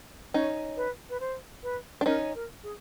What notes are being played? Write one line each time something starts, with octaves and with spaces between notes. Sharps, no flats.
C#4 D#4 C#5
B4
B4
C5
B4
D4
C#4 D#4 A#4
A#4
G#4